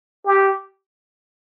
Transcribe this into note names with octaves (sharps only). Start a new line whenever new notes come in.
G4